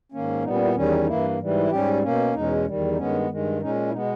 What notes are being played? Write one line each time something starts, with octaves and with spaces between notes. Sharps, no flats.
G#2 D#3 A#3 C#4
A#2 G3 B3 D#4
C#4
E4
E2 D#3 G3 C#4
D#4
D#4
G2 E3 A#3 E4
G#2 E3 G3
E4
G#2 G3 C#4 G4
B2 A#3 C#4
E2 B2 G#3 C#4 D#4
E2 D#3 G3
D#4
G2 D#3 G#3 B3 C#4
G2 D#3 G#3
A#2 G#3 C#4 D#4
E4
B2 G#3 B3 D#4